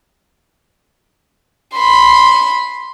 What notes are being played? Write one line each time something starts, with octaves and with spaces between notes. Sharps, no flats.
B5 C6